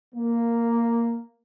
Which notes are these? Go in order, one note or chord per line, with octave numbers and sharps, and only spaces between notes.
A#3